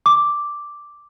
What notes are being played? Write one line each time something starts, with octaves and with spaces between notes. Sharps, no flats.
D6